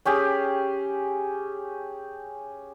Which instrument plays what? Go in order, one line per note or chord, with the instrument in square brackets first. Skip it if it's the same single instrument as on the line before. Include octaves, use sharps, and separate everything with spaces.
[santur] C#4 G4 G#4